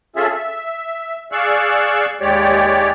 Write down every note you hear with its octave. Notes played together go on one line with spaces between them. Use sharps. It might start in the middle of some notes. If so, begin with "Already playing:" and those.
C#4 F4 G#4 A4 E5
E5
G#4 D5 F5 C#6 E6 F#6
D#2 G#3 G4 C#5 D5